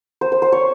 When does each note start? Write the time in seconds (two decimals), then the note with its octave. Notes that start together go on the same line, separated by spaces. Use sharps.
0.21 C5
0.32 C5
0.42 C5
0.52 C#5